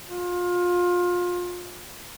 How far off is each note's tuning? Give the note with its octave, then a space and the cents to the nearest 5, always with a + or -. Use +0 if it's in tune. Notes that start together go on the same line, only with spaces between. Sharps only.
F4 +25